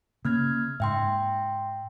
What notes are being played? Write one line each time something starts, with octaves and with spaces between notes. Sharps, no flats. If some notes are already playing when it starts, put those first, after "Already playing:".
C#3 A#3 F6 G#6
G#2 E5 G5 C6